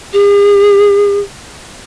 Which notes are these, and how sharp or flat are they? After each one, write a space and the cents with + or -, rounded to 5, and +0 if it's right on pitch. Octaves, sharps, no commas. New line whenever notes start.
G#4 -40